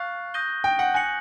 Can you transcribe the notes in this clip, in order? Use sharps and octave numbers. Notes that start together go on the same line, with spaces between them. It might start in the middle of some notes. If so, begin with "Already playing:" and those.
Already playing: F5 C#6 F#6 A6
D#6 G6 A#6 D#7 G7
G5
F#5
G#5 F#6 A#6 C#7 F#7